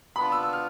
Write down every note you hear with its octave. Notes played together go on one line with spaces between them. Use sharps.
B3 D4 F4 B5
E6
E6
F6